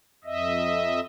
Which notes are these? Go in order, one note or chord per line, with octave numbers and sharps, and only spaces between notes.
F2 D#5 E5